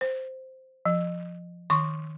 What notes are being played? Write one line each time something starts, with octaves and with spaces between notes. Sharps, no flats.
C5
F3
D#3 C6 C#6